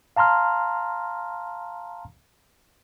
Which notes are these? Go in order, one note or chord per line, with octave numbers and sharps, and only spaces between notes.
F5 A5 A#5 C6 F6